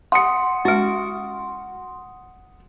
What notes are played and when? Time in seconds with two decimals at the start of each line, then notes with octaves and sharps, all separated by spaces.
0.12 F#5 C6 D#6 C#7
0.65 G#3 C#4 F#4